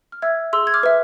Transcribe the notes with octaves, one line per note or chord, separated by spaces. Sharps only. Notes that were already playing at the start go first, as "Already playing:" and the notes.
F6
E5 E6 G#6
G#4 C6 E6
G#6
D6 F6
B4 E5